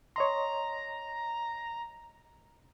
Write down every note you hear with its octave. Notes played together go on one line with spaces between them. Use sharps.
C#5 D#5 A#5 C6